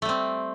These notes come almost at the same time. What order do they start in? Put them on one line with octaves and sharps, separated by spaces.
A3 G3 C4